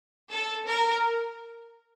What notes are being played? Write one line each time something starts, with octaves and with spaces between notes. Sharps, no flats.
A4
A#4